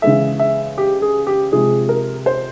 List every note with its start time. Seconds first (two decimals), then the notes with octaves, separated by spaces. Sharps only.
0.02 C#3 E3 G#3 E5
0.39 E5
0.78 G4
1.02 G#4
1.27 G4
1.52 C3 F3 G#3 G#4
1.89 A#4
2.26 C5